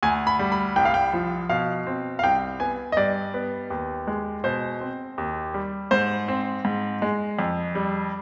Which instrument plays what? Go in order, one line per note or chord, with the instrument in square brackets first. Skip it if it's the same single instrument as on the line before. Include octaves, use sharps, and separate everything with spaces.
[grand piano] D2 G#5
B5
G3
B5
C2 G5
F5
G5
F3
B2 F5
C4
F5
C2 G5
B3 G#5
D#5
G2 D5
B3
D#2
G#3
B2 C5
C4
D#2
G3
G#2 C5
C4
G#2
G#3
F2
G3